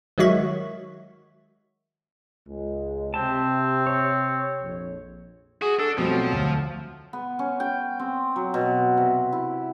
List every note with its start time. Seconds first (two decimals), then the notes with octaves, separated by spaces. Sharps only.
0.18 D#3 F#3 G#3 F#4 E5 C#6
2.48 C#2 G#3
3.14 C3 C4 G4 A5
3.87 C#5
4.62 A#1 F2
5.62 F#4 G#4
5.79 D4 A4
5.98 B2 F3 G3 A3 C4
6.11 F#3
6.32 D2
7.13 B3
7.39 C#4
7.60 G5
7.99 C4
8.36 F#3
8.54 B2
8.97 C3
9.32 E4